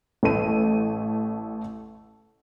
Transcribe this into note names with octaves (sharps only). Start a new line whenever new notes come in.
A1 A3 D#7